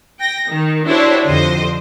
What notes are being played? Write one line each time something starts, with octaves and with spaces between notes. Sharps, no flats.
G5 A#6
D#3
D4 E4 F#4 G4 C5 C#5
F2 D3 C5 D#5